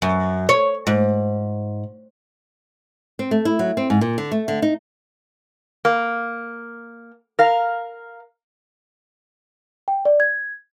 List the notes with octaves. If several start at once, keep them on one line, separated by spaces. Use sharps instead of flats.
F#2
C#5
G#2
C4
A3
E4
F#3
C4
G#2
A#2
D3
A3
D3
D#4
A#3
A#4 F5
G5
D5
G#6